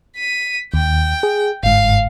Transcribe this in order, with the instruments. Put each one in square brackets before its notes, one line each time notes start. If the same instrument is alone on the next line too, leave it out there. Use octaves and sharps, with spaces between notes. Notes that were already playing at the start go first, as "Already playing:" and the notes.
[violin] B6 D#7
[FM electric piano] D#2 [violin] G5
[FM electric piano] G#4
[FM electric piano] G1 G#2 [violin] F5